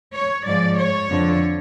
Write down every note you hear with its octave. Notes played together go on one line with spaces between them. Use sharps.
C#5
G#2 F3 D5
C#5
F2 D3 F3